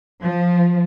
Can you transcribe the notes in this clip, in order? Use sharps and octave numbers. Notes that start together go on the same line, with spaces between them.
F3